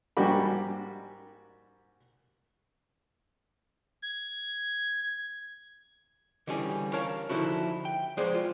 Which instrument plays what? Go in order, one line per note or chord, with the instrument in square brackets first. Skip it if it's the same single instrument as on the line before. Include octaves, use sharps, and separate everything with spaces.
[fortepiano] G#2 G3 A#3 F#4 G4 B5
[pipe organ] G#6
[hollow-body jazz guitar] D3 E3 G3 C#4 F4 G#4
A#4 C#5 F5 A5
D3 F3 D#4 E4 F#4
G5
F3 G#3 B3 G#4 C5 D5
F4